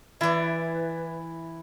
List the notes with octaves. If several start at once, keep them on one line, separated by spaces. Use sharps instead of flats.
E3 E4 B4 D5